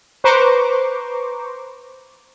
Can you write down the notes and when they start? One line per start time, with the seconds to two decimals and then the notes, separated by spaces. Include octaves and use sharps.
0.24 B4 C5 A#5 C#6 D6